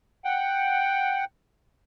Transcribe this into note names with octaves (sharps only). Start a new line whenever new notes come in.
F#5 G5